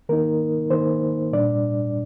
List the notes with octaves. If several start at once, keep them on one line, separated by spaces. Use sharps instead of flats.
D#3 A#3 D#4 A#4
D#3 A#3 D#4 C5
A#2 G3 D4 D5